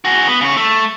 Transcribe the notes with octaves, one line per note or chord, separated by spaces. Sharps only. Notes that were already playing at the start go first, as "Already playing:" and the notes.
F#4 G#4
B3
C#3 C#5
A3